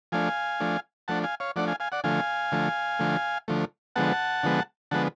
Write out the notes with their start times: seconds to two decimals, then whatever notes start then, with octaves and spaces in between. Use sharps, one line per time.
0.12 F3 A3 D4 F5 G#5
0.60 F3 A3 D4
1.08 F3 A3 D4 F#5 A5
1.24 F5 G#5
1.40 C#5 F5
1.56 F3 A3 D4 D5 F#5
1.68 F5 G#5
1.80 F5 G#5
1.92 D5 F#5
2.04 D3 F3 A3 F5 G#5
2.52 D3 F3 A3
2.99 D3 F3 A3
3.48 D3 F3 A3
3.96 D3 F3 G#3 B3 F#5 A5
4.43 D3 F3 G#3 B3
4.91 D3 F3 G#3 B3 F#5 A5